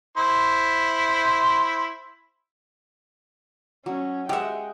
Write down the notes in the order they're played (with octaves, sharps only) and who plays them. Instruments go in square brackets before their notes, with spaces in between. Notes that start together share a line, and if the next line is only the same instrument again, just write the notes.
[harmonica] E4 C5 C6
[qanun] F#3 [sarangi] C#4
[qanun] G#3 F#5 [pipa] G4 E5 [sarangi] G5